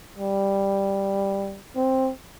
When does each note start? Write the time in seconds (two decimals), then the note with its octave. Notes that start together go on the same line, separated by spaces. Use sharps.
0.18 G3
1.76 C4